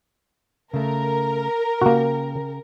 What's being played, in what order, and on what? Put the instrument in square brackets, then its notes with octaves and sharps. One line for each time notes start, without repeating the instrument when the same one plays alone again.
[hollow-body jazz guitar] C#3 A3 [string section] A#4
[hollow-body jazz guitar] C#3 G4 [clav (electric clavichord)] A#3 F#4